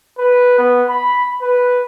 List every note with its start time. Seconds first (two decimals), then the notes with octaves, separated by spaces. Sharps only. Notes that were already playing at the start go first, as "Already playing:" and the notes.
0.18 B4
0.58 B3
0.89 B5
1.42 B4